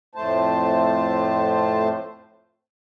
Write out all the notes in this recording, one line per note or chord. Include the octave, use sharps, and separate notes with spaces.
F2 A2 A3 C5 A5